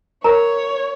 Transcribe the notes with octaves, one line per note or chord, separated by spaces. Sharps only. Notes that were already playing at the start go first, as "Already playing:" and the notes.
A#4 C#5 A#5